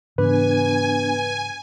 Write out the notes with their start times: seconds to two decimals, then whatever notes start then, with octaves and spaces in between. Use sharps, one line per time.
0.18 G#2 C#3 E3 B3 D4 B4 G#5